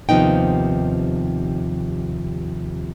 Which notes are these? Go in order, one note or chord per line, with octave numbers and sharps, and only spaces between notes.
D#2 C3 F3 B3 D#4 G5